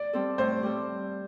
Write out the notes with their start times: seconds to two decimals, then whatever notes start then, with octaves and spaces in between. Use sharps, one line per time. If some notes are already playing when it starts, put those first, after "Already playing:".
Already playing: D5
0.13 G3 C4 A4
0.38 A2 C5
0.63 G3 C4 A4